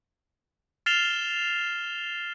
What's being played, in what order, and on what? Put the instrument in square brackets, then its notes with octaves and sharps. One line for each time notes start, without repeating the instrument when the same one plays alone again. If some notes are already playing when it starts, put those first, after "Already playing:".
[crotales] F6 A6 C7 E7 F7 G7